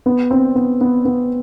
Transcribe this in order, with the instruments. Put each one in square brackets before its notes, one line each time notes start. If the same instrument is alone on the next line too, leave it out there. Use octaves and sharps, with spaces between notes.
[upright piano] B3
C4
B3
B3
B3